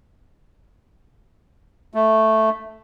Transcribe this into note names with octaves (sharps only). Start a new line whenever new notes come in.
A3